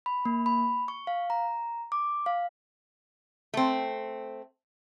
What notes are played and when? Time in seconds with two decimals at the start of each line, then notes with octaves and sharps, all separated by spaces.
0.06 B5
0.25 A#3
0.46 B5
0.88 C#6
1.07 F5
1.30 A#5
1.92 D6
2.26 F5
3.54 A3 C4